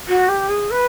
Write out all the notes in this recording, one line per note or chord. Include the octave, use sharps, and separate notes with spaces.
F#4
G4
G#4
B4